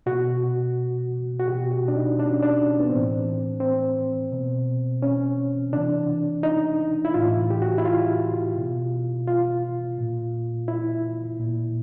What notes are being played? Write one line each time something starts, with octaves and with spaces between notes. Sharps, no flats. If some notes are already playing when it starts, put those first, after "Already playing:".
B2 F#4
F#4
B2 G4
F#4
D4
D#4
D4
C#4
D4
B3
A2 E3 C4
C4
B2
C#4
C3 E3 D4
D#4
E4
A2 E3 F4
G4
F#4
E4
F4
B2
F4
A#2
E4
A#2